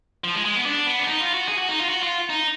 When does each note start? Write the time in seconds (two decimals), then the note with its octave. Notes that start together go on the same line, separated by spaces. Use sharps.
0.24 F3
0.35 G#3
0.45 G#3
0.55 B3
0.66 D4
0.86 B3
1.00 D4
1.07 D#4
1.20 F4
1.34 F#4
1.48 G#4
1.58 F#4
1.69 D#4
1.79 F4
1.89 F#4
2.03 F4
2.30 D#4